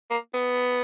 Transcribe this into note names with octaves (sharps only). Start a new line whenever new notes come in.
A#3
B3